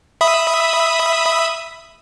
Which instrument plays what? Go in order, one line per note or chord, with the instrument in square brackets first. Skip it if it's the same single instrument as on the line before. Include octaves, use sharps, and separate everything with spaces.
[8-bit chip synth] E5 B5 D#6